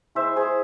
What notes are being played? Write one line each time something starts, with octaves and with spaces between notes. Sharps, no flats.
G#3 E4 C5 E5
G#4 C5